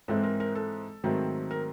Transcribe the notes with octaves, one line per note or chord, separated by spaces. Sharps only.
G#2 E3 G#3 C4 A4
A#4
A#4
A4
G#2 D#3 F#3 A3 C4
A#4